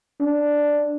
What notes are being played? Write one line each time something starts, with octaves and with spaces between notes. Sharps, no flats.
D4